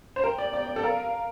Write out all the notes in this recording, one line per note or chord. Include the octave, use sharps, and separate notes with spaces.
C5
A#4 G5
D5
D5 G5
D5
A4
A#4 F5